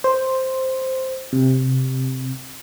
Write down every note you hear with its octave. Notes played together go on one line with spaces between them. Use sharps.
C5
C3